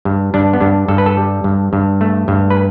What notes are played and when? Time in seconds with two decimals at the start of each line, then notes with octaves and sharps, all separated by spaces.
0.05 G2
0.34 G2 D4
0.53 B3
0.61 G2 D4
0.88 G2 A4
0.98 B4
1.06 A4
1.17 G3
1.44 G2
1.73 G2
2.01 A3
2.28 G2
2.50 B4